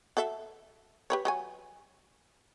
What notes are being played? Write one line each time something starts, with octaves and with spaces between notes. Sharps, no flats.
F#4 A4 E5
G4 B4 C#5
F#3 C#5 G#5